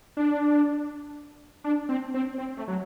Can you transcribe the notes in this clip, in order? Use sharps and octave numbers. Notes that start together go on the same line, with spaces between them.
D4
D4
C4
C4
C4
A3
F#3